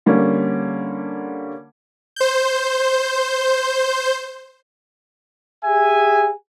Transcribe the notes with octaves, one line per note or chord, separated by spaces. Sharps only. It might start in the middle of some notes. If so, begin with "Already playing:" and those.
D3 G3 A#3 C#4
C5 G6
G4 G#4 E5 G#5